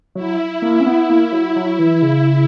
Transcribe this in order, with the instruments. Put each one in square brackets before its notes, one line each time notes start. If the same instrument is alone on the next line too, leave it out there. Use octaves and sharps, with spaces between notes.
[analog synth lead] F#3 [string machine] E4
[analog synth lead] A#3
C#4
B3
A#3
F#3
F#3
E3
C#3